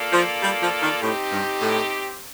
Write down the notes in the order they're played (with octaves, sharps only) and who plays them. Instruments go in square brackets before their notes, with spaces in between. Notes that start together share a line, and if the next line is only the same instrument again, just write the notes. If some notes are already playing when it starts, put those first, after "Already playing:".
Already playing: [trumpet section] A#3 F4 A4 D5 F5
[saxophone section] F3
G3
F3
D#3
[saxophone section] A2 [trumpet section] C4 D#4 G4
[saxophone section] G2
A2